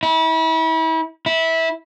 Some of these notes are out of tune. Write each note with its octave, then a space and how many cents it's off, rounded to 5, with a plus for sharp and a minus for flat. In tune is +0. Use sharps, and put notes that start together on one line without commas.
E4 -35
E4 -15